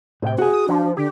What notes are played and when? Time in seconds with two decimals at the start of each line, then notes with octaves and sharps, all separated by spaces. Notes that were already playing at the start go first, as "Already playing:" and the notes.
0.22 A2 C3 G5
0.38 F#4 G#4 G#5
0.53 D#6
0.69 F3 D4
0.97 D3 G4